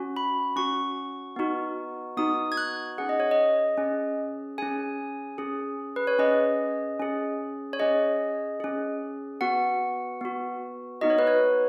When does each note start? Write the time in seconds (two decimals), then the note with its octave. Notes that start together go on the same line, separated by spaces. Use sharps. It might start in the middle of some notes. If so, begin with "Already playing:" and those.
Already playing: C#4 F#4
0.17 B5
0.56 C#4 F#4 C#6
1.36 B3 D#4 F#4
2.17 B3 D#4 F#4 D#6
2.52 G#6
2.57 F#6
2.98 C#4 G#4 F#5
3.09 D#5
3.20 C#5
3.31 D#5
3.77 C#4 G#4
4.58 C#4 G#4 G#5
5.38 C#4 G#4
5.96 B4
6.07 C#5
6.19 C#4 G#4 D#5
7.00 C#4 G#4
7.73 C#5
7.79 C#4 G#4 D#5
8.60 C#4 G#4
9.41 B3 F#4 F#5
10.21 B3 F#4
11.01 B3 D#4 F#4 D#5
11.10 C#5
11.19 B4
11.27 C#5